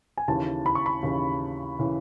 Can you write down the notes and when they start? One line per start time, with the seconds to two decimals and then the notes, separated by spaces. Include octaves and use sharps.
0.17 G#5
0.28 D#2 C#3 E3 A5
0.66 B5
0.75 C#6
0.86 B5
1.02 D#2 C#3 E3
1.79 C#3 E3